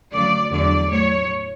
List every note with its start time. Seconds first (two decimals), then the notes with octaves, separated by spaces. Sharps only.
0.13 D2 C#3 F#3 D5
0.51 E2 D3 F#3 D5
0.90 A2 F#3 C#5